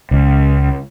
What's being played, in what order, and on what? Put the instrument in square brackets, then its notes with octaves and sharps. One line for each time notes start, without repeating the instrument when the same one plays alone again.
[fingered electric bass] C#2